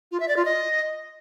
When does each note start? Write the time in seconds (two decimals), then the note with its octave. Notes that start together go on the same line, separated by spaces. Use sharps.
0.12 F4
0.20 E5
0.28 D5
0.37 F4
0.45 D#5